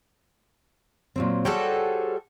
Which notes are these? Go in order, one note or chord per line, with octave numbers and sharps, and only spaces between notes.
A#2 F#3 C4
G3 F#4 G#4 A4 C5 C#5